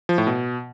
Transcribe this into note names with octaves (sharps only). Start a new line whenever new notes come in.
F3
A2
B2